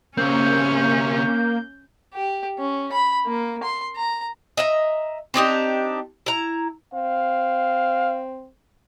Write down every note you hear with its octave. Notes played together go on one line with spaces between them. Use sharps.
C#3 A#3 C4 C#4 G6
G4
C#4
B5
A#3
C6
A#5
D#5 E5 A#5
C4 D4 D#4 G4
E4 A#5
C4 F5